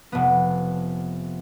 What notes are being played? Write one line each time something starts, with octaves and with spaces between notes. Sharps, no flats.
F1 B3